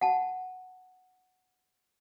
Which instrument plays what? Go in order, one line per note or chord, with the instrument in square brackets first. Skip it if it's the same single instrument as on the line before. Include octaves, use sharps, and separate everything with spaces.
[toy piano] F#5 A5